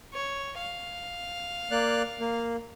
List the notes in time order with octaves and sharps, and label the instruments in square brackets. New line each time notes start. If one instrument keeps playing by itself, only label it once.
[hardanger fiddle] C#5
F5
[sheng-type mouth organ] A#3 D5 F#6
A#3